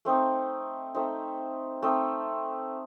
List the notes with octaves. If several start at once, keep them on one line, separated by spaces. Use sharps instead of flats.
A3 C4 D#4
A3 C4 D#4
A3 C4 D#4